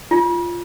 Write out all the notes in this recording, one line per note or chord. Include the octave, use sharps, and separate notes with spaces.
F4